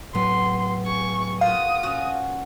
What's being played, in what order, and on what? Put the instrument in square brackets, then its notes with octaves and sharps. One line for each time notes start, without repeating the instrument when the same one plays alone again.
[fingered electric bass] A2 F#3 [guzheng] B3 [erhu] C6
[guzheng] G#4 [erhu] C#6
[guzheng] A#2 F#4 [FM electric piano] F5 [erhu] D#6
[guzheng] C#4 F#4